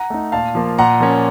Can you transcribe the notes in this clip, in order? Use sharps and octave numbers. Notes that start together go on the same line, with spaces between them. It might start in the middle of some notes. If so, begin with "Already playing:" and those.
Already playing: F#5 A#5
A3 D#4
A#2 F5 A5
F3 A#3
A#2 F#5 A#5
F3 A#3 C#4